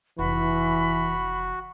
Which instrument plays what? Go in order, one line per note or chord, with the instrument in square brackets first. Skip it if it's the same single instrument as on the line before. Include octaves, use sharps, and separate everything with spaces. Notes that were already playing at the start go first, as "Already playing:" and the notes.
[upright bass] F1 [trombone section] E3 [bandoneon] F#4 [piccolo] B5